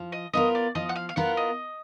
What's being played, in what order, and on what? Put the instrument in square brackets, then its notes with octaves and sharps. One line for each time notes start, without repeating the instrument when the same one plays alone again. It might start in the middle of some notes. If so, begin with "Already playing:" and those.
Already playing: [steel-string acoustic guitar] F3
[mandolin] D#5
[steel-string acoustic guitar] B3 F4 A#4 [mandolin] D#5
[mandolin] D5
[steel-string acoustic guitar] F3 [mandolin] D#5
[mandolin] F#5
F5
F5
[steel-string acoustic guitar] B3 F4 A#4 [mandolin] F#5
[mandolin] D#5